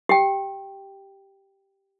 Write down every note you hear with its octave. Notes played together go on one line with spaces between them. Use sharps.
G4 G5